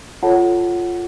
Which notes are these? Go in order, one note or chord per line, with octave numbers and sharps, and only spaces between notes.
F4 A4 C#5 F#5 A5